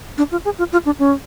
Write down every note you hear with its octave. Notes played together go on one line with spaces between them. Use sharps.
D4
F4
G#4
F4
F4
D4
C#4